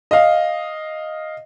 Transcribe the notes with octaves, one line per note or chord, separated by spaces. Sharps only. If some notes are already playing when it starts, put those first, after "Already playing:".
D#5 F5